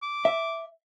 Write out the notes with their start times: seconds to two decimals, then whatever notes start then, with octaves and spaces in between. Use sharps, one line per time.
0.03 D6
0.25 E5